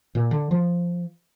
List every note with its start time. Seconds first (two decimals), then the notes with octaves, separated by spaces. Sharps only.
0.15 A#2
0.31 D3
0.51 F3